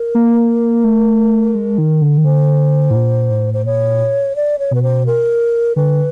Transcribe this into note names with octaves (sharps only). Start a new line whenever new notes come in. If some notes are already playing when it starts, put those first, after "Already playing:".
Already playing: A#4
A#3
A3
G#3
D#3
D3
D#3
D3 C5
A2
A#2
A2
C5
A#2 C#5
D5
C#5
B2 B4
C5
A#4
D3 B4